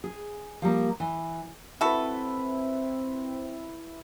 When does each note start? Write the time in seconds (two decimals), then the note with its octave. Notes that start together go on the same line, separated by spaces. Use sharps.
0.04 G#4
0.62 F3 G3 A#3
1.00 E3
1.81 C4 E4 F#4 A4 B4